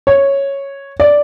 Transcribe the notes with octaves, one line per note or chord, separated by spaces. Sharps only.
C#5
D5